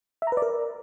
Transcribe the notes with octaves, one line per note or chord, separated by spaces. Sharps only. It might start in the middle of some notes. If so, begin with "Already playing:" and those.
E5
A#5
B4
D5
A#4